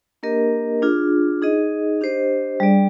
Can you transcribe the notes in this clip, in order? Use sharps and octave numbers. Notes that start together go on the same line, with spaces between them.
A#3 D4 G4 A#4 D#5
D4 F4 G#4
D#4 G#4 D#5
D4 G4 C5 D#5
G3 D4 G#4 D5